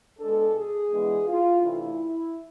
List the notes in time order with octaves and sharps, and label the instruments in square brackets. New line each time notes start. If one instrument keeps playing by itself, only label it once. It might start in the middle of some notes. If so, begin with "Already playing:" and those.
[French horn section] B2 G#3 D4 A4
G#4
E3 G#3 B3 D4
F4
C3 E3 A3 D4 E4